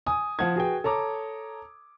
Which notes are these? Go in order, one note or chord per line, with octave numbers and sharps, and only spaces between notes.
G#5 D#6
F3 F#5 A5 G#6
F#4 G#4 B4 G5
A4 C#5 A#5 D6